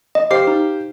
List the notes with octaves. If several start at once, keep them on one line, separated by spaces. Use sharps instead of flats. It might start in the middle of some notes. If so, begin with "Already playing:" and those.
D#5
G4 C5 F5 D6 C7
D#4